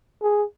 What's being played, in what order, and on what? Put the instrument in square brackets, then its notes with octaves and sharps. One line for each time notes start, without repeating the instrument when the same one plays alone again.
[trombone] G#4